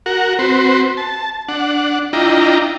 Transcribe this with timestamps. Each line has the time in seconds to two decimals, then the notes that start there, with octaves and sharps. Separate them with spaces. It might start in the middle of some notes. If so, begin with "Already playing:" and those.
0.06 F#4 A#4 F#5
0.39 C4 F#4 B4 C5
0.97 A5
1.48 D4 F#5
2.13 D4 E4 F4 D#5 G5 A#5